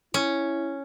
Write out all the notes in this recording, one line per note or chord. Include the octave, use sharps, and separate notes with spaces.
C#4 E4